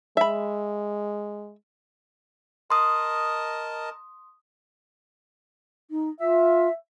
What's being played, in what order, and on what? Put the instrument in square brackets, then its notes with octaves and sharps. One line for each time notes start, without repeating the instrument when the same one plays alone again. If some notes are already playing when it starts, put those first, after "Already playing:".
[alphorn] G#3 [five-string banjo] E5 B5
[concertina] A#4 D#5 A5 [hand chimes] C6 D#6
[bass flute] D#4
[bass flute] F4 [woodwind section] E5